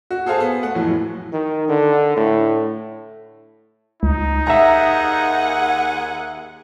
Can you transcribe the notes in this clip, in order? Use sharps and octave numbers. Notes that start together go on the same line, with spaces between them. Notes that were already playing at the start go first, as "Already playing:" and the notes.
F#4
G#4 A4 C5 F5 G#5 A5
B3
A3 F#5
F2 A2 E3 F#3
D#3
D3
A2
C#2 D#4
D#2 G#4 E5 F#5 A#5